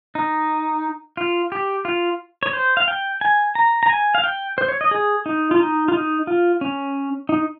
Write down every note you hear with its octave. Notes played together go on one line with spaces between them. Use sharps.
D#4
F4
G4
F4
C#5
C5
F5
G5
G#5
A#5
A#5
G#5
F5
G5
C5
C#5
D#5
G#4
D#4
F4
D#4
F4
D#4
F4
C#4
D#4